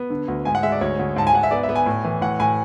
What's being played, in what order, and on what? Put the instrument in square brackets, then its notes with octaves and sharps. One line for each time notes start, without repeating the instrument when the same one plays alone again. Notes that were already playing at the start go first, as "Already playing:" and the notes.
Already playing: [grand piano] B3
D3
D2
G#2 G#5
F#5
G#3 E5
D5
D2 C#5
D2
G#2 A5
G#5
G#2 F#5
E5
B3 D5
E5
B3
G#5
A2
E3
A2 F#5
A2 G#5